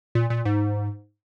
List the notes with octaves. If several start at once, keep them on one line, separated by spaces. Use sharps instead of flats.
A#2
A#2
G#2